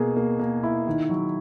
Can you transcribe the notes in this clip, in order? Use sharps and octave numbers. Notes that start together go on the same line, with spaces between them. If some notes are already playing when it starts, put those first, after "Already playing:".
Already playing: B2 A#3 G#4
A#3
A#3
E4
D#3
F#3